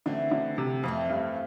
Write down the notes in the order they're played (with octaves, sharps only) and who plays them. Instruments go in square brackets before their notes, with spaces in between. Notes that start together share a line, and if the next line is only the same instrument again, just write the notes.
[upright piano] D3 [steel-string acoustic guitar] E3 A3 C4
[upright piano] D3
C3
[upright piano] F2 [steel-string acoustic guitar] E3 A3 C4
[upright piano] G2